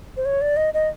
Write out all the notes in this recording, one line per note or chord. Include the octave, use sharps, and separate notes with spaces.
C5
C#5
D5
D#5
D#5